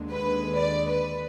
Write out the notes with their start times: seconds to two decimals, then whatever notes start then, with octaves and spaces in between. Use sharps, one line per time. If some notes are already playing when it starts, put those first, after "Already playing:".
Already playing: D#2 D3 G#3
0.10 B4
0.55 D5
0.85 B4